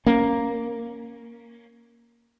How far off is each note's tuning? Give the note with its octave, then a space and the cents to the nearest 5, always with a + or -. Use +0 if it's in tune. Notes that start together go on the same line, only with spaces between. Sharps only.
A#3 +5 C#4 +0